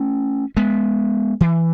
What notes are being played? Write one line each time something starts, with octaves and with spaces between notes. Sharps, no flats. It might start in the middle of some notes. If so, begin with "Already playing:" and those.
Already playing: A3 C#4
G#3 B3
E3